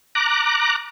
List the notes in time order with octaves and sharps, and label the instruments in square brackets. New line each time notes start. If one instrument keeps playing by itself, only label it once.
[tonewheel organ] A#5 D6 F#6